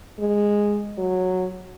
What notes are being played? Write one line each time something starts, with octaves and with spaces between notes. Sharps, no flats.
G#3
F#3